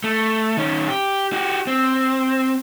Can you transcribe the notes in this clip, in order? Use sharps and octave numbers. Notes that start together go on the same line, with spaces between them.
A3
D#3 C#4
G4
F#4 G4
C4